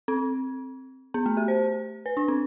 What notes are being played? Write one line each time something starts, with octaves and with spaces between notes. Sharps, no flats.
C4
B3
A3
G4
C5
B4
D4
C4